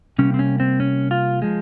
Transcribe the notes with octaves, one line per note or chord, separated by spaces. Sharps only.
C3 G3 A#3 C#4
C4
C#4
C4
C#4
F4
F3 G#3